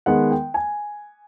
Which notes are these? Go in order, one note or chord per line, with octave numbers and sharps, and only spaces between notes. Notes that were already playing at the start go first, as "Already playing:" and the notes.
D#3 G#3 B3 F#5
G5
G#5